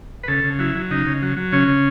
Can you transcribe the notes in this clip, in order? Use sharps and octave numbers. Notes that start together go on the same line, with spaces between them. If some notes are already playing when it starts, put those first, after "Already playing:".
B4
C#3 A4
C#3
F#3 E4
F#3
C#3 D#4
C#3
F#3
F#3
C#3 C#4
C#3